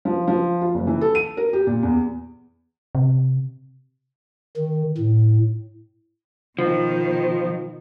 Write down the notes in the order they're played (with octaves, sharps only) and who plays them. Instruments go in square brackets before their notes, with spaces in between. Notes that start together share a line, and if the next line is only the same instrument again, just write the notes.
[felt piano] F3
F3
F4
F#1
E3
A4
D#7
A#4
G4
A#2
E2
[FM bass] C3
[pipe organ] D#3
A2
[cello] B2 D#3 [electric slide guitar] F3